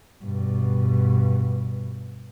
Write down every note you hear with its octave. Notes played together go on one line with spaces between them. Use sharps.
G2 B2